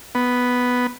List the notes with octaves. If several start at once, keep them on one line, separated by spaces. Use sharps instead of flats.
B3